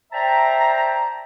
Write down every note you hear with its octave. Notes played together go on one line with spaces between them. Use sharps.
C5 D5 E5 G5 A5 A#5